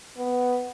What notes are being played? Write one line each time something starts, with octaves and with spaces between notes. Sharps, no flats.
B3